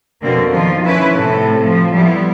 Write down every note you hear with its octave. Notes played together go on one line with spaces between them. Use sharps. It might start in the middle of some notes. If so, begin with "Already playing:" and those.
F2 B2 D3 A#3 C4
D#3 F3 F4
C#4 E4 B4
A2 C3 A4
F3
G3 B3 E4